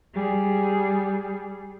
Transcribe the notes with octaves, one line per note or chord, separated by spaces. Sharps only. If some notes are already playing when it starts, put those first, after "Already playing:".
G3 G#4